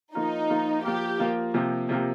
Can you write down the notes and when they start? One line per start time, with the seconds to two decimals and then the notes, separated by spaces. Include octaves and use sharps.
0.15 F3 A#3 D#4 F4 A#4
0.50 F3 A#3 F4 A#4
0.84 F3 A#3 F4 G4 A#4
1.19 F3 A#3 F4 A#4
1.54 C3 F3 A#3 G4
1.89 C3 F3 A#3 G4